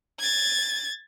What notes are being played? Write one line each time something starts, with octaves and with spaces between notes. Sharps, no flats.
G#6 A6